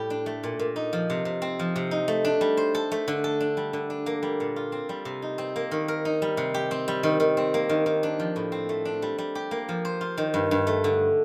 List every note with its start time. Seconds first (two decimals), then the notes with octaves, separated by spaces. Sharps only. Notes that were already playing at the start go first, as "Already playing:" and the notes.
Already playing: A2 G3 G4
0.10 D4
0.26 A3
0.43 A#2
0.59 A#2
0.76 D#4
0.93 F3
1.10 C3
1.25 C3
1.42 C4
1.59 F3
1.76 C3
1.91 D#4
2.08 A3
2.25 D4
2.41 G3
2.57 C5
2.75 A4
2.92 A3
3.08 D3
3.24 A4
3.40 D4
3.57 G3
3.73 D3
3.90 D4
4.06 A#3
4.22 G3
4.40 A#2
4.56 F4
4.72 C4
4.89 G3
5.05 C3
5.22 D#4
5.38 C4
5.56 A#3
5.71 D#3
5.88 A#4
6.05 D#4
6.22 G3
6.37 C3
6.54 G4
6.71 C4
6.88 G3
7.03 D#3
7.20 D#3
7.37 C4
7.54 A#3
7.69 D#3
7.86 D#3
8.03 D4
8.19 F3
8.36 A2
8.52 C4
8.69 A3
8.85 D4
9.02 G3
9.18 G3
9.35 G4
9.51 A#3
9.69 F3
9.85 C5
10.01 F4
10.18 D#3
10.34 G2
10.51 G2
10.67 A3
10.84 D3